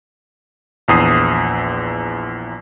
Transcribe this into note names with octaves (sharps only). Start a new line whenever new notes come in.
A#1 E2 D#6 C7